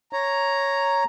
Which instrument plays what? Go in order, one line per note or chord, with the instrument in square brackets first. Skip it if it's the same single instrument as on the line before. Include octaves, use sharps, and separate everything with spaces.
[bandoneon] C#5 [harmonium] A#5